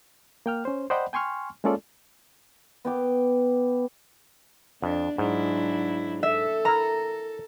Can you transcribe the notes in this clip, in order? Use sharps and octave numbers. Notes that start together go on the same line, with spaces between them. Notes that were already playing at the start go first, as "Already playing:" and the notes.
A#3 G5 F6
C#4 C5
C5 D5 D#5 F#5 G5 B5
G5 G#5 C6 C#6 F6
G#3 A#3 C#4 F4 A4 D5
B3 G5 D6
F2 D4
G#2 F#3 D4 E4
A4 E5
E4 A#4 A#5